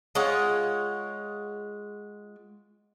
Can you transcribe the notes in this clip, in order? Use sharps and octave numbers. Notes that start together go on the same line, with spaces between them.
G#3 F4 C#5 F#5